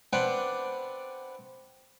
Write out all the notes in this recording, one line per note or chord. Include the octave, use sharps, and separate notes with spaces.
B3 C4 D4 B4 D5 F#5